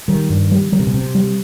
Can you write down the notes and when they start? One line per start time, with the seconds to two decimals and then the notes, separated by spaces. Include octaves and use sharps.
0.08 D#3 G3
0.30 G2
0.51 G3
0.72 D#3 G3
0.80 C3
0.87 B2
0.94 C3 C4
1.15 G3